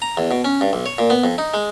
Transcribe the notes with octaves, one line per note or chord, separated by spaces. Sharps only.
A#5
E2
B2
C#4
G2
B1
C#5
A#2
B3
F2
D#4
G#3